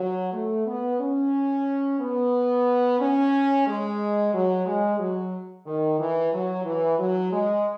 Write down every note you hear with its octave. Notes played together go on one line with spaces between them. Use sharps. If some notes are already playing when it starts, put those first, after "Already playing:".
Already playing: F#3
A3
B3
C#4
B3
C#4
G#3
F#3
G#3
F#3
D#3
E3
F#3
E3
F#3
G#3